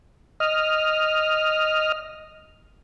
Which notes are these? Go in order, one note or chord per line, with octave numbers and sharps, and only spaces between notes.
D#5 F6